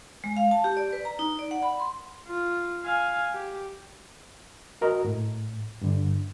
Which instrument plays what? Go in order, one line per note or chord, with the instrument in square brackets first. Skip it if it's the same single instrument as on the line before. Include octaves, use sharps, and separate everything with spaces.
[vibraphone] G#3
F5
A5
G4
D5
B4
A#5
D#4
D5
F#5
B5
C6
[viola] F4
F5 G#5
G4
[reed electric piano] F#4 A#4 D#5
A2
G2 D3